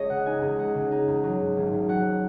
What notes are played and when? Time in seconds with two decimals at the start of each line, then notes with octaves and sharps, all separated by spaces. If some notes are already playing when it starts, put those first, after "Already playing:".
Already playing: C#2 G#3 C#5 D#5
0.09 C#3 F#5
0.26 D#4 G#5
0.41 C#2 G#5
0.58 G#3 F#5
0.74 C#3
0.91 D#4
1.08 C#2
1.24 F#3
1.41 G#2
1.57 G#1
1.73 G#1
1.89 F#3 F#5